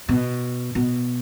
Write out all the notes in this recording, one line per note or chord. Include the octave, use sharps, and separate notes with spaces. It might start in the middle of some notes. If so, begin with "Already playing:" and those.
B2
B2